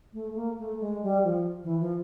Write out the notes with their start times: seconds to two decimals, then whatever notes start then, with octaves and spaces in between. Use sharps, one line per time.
0.13 A3
0.34 A#3
0.58 A3
0.80 G#3
1.02 G3
1.23 F3
1.63 E3
1.79 F3